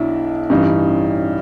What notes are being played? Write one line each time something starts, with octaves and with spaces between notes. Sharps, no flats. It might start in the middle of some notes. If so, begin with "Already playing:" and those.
Already playing: B1 B2 D4 E4
A1 G2 E3 C#4 D#4